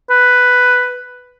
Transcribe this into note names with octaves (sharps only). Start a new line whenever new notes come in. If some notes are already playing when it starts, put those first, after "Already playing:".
B4